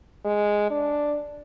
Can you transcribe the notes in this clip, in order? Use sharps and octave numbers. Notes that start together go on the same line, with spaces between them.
G#3
D4